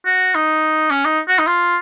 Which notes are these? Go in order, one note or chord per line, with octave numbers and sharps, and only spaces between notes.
F#4
D#4
C#4
D#4
F#4
D#4
F4